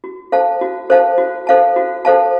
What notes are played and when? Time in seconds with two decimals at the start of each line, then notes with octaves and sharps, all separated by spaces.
0.04 F#4
0.32 A4 C5 F5 A5
0.61 F#4
0.90 A4 C5 F5 A5
1.18 F#4
1.47 A4 C5 F5 A5
1.76 F#4
2.05 A4 C5 F5 A5